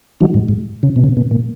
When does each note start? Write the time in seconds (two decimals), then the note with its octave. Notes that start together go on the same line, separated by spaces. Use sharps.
0.20 D#3 F#3
0.34 G#2
0.48 G#2
0.83 C#3
0.96 B2
1.04 C#3
1.17 B2
1.31 A#2